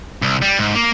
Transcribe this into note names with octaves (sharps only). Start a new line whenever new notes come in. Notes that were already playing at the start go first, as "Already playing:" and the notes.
C2
G3
G#2
A#3